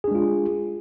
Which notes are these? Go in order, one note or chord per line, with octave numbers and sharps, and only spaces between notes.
G#3 D4 F4 G#4